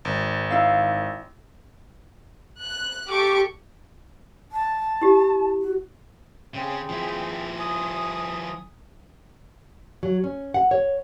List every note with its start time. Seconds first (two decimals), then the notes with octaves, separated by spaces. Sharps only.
0.05 G#1
0.50 D#4 E4 F5
2.63 F#6
3.09 G4 A4 C#6 D6
4.52 A5
5.02 E4 G4
5.61 F#4
6.54 C#3 C4 G#4
6.89 F3 E4
7.58 G#5 D#6
10.03 F#3
10.24 C#4
10.54 F#5
10.71 C#5